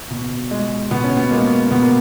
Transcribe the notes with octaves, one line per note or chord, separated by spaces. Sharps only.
B2
G#3
B2 B3
C#4
B3
G#3 A#3
B2 B3
A#3